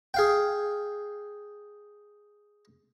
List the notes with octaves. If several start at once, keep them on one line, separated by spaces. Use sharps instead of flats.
G#4 F5 G5